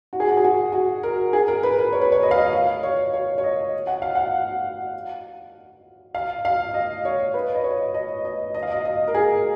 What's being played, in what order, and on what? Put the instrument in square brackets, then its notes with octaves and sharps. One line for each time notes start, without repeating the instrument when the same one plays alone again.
[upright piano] F#4
G#4
F#4
G#4
F#4
F#4
A#4
G#4
A#4
B4
B4
C#5
B4
C#5
D#5
F5
D#5
F5
C#5
C#5
C#5
D#5
F#5
F5
F#5
F5
F5
D#5
C#5
B4
D#5
C#5
D#5
D#5
D#5
F5
D#5
D#5
A#4
G#4